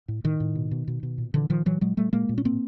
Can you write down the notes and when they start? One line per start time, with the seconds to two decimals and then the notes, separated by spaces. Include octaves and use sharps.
0.08 A2
0.24 A2 D#3
0.40 A2
0.55 B2
0.71 B2
0.88 B2
1.03 B2
1.18 A#2
1.34 A#2 D3 E3
1.49 A#2 D#3 F3
1.66 A#2 E3 F#3
1.81 A#2 F#3 G#3
1.97 A#2 G3 A3
2.13 A#2 G#3 A#3
2.29 A#2
2.38 C#4
2.44 A2 A#3 C4